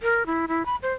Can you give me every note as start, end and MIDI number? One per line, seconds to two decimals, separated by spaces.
0.02 0.26 70
0.26 0.46 64
0.48 0.65 64
0.65 0.76 83
0.82 0.93 72